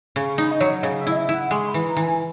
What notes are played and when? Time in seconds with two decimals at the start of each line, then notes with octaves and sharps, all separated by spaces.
0.16 C#3 C#6
0.38 D#4 B5
0.51 D#5
0.60 F#3 C#5
0.83 C#3 D#5
1.01 E5
1.07 E4
1.12 D#5
1.17 E5
1.29 E4
1.34 F#5
1.51 G#3 C#6
1.64 C#6
1.68 B5
1.74 E3
1.85 A#5
1.97 E3
2.02 G#5